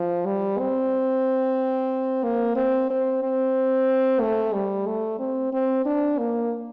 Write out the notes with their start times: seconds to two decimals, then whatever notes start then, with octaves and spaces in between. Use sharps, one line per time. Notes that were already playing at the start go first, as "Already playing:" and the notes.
Already playing: F3
0.26 G3
0.59 C4
2.24 A#3
2.56 C4
2.90 C4
3.23 C4
4.21 A3
4.54 G3
4.87 A3
5.19 C4
5.53 C4
5.86 D4
6.19 A#3